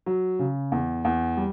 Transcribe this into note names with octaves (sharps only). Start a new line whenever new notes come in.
F#3
C#3
E2
E2
G3